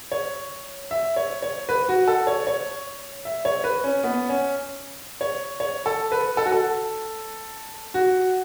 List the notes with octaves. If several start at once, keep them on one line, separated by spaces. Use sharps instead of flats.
C#5
E5
C#5
C#5
B4
F#4
A4
C#5
C#5
E5
C#5
B4
C#4
B3
C#4
C#5
C#5
A4
B4
A4
F#4
A4
F#4